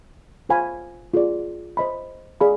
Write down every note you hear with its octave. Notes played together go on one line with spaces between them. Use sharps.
F4 C5 F5 G#5 B5
F4 G#4 D5
C5 D#5 B5
G#4 D5 F5 B5